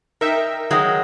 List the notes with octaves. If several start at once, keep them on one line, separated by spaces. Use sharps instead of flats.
D#4 A#4 E5 G5
D#3 F#3 G#3